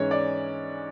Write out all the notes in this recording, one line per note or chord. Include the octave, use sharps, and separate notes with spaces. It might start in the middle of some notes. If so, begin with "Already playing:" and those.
Already playing: G#2 E3 G#3 C#4 C#5
D5